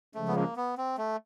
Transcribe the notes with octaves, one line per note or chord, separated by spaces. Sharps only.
C#3 F3 G#3 A3
B3
A#3
B3
C4
A3